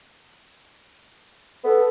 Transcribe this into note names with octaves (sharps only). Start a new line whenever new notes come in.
B3 A4